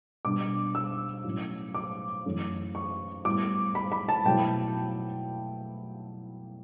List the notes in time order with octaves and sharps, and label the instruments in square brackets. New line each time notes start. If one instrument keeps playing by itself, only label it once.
[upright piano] B2 G3 D4 D6
E6
A2 F#3 C#4
D6
F#2 E3 A3 C#4
C#6
A2 G3 B3 E4 D6
B5
B5
A5
B2 F#3 A3 E4 G5